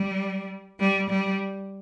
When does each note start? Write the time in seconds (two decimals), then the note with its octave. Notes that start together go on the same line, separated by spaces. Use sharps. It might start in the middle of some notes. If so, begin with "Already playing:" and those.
Already playing: G3
0.80 G3
1.10 G3